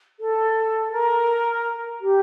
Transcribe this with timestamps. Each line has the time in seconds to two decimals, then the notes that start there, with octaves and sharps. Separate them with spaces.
0.19 A4
0.92 A#4
2.00 G4